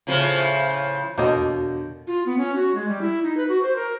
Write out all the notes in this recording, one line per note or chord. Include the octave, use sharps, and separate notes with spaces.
A2 C#3 F3
E2 B2 D3 A#3 F#4 C#5 D#5 G6
F4
B3
C#4
F#4
G#3
G3
E4
D#4
B4
F#4
C5
A#4